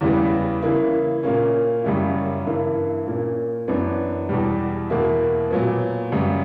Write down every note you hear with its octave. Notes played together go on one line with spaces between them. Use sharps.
E2 C#3 E3 G3 B3
C#3 E3 A#3 E4
A#2 A#3 C#4
F#2 C#3 G3 C#4 E4
G2 E3 A#3 E4
A#2 A#3 C#4
F#2 E3 B3 D4
E2 B2 G3
E2 B2 A#3 E4
A#2 F#3 B3
F#2 C#3 G3